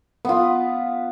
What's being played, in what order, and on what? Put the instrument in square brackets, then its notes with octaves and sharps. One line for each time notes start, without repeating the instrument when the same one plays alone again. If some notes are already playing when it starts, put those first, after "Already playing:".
[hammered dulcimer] B3 F4